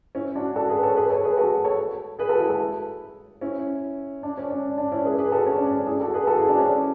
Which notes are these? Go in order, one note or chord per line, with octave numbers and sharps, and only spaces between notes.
C#4 E4
D4 F#4
F#4 A4
G#4 B4
A4 C#5
G#4 B4
A4 C#5
G#4 B4
F#4 A4
A4 C#5
G#4 B4
F#4 A4
E4 G#4
F#4 A4
C#4 E4
D4
C#4
D4
D4
C#4 E4
G#4 B4
G#4 B4
F#4 A4
C#4
D4
C#4
D4
E4 G#4
F#4 A4
G#4 B4
F#4 A4
E4 G#4
D4 F#4
C#4 E4